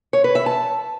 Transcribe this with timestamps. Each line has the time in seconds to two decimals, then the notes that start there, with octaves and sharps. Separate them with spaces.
0.13 C#5
0.24 B4
0.35 E5
0.46 A5